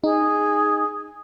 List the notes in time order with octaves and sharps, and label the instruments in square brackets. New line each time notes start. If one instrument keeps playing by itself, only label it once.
[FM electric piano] D#4 [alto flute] G#4